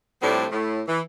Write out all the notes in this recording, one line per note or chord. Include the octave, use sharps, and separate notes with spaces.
A2 F3 G3 A3 C4 D4
A2
E3